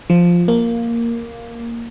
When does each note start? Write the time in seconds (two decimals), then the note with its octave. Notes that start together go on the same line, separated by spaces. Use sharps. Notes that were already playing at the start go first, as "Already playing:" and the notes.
0.10 F3
0.48 A#3